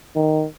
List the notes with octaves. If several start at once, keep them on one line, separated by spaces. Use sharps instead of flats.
D#3